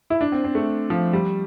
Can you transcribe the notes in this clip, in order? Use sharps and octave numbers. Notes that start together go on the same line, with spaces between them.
E4
D4
C4
C4
A3
F3
G3